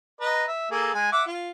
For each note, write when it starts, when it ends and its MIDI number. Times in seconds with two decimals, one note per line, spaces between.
0.21 0.45 71
0.21 0.45 75
0.21 0.45 82
0.48 0.68 76
0.71 0.93 58
0.71 0.93 68
0.71 0.93 69
0.94 1.11 56
0.94 1.11 80
1.12 1.23 76
1.12 1.23 78
1.12 1.23 86
1.26 1.50 65